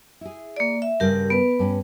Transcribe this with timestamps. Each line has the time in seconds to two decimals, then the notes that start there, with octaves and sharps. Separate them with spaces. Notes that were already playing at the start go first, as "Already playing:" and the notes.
0.21 E4 G#4
0.56 A#3 D5
0.82 E5
1.00 G2 C#3 G3 G4 A#4
1.30 B3 B4
1.59 G2 C#4